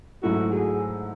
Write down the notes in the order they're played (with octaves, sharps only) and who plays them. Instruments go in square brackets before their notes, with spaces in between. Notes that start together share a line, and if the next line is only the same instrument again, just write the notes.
[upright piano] G#2 F#3 A3 E4 [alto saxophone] F#4
[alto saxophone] G#4